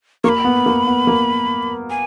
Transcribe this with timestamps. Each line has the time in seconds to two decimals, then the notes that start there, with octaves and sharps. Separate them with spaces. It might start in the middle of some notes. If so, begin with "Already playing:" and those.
0.24 A#3 C#6
0.29 B5
0.44 B3
0.66 A#3
0.87 B3
1.07 A#3
1.90 G#5